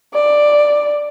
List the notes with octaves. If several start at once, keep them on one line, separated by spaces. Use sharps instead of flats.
D5